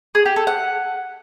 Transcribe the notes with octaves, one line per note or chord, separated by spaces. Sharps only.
G#4
G4
A4
F#5